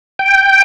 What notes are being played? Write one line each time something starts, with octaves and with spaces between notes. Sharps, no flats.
G5